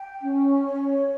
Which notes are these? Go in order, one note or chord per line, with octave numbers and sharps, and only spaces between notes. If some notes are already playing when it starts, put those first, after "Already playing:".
Already playing: G5
C#4
C#5